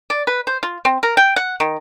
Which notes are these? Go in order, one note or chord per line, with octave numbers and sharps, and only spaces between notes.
D5
B4
C5
F4
C4
A#4
G5
F#5
D#3